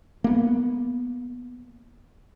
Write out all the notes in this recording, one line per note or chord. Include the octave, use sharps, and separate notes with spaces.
A#3 B3